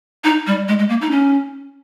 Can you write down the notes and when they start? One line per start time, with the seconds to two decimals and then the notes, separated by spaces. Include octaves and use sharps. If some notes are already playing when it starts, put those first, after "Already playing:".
0.24 D#4
0.47 G3
0.68 G#3
0.79 G#3
0.89 A#3
1.02 D#4
1.11 C#4